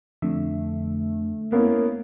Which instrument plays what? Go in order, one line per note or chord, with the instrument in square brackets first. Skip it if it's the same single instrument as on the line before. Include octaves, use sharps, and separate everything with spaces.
[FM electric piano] F2 D3 E5 [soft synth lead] A3
[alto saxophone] A#3 [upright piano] B3 C#4 E4